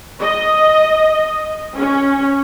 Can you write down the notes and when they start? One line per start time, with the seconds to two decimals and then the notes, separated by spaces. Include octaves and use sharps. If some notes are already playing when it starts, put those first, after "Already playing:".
0.21 D#5
1.78 C#4